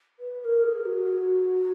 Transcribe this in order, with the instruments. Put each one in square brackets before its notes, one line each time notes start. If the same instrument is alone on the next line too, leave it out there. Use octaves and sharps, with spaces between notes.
[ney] B4
B4
A#4
G#4
F#4